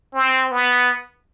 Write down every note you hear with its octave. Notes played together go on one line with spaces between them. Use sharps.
C4
B3